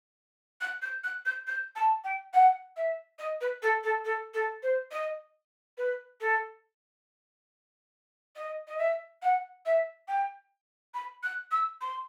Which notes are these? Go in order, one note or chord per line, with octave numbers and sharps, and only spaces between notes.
F#6
G6
F#6
G6
G6
A5
G5
F#5
E5
D#5
B4
A4
A4
A4
A4
C5
D#5
B4
A4
D#5
D#5
E5
F#5
E5
G5
B5
F#6
E6
C6